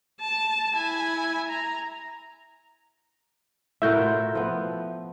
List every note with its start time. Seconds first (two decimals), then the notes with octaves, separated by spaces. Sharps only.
0.21 A5
0.74 E4 G#5
1.49 A#5
3.82 A2 F#4 A#4 E5 G6
3.98 F4
4.35 F3 B3